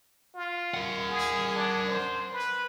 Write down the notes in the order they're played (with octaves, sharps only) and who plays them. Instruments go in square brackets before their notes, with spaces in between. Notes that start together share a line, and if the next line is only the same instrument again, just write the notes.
[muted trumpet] F4
[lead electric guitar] A#4 F#5
[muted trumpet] G#4
D4
C5
B4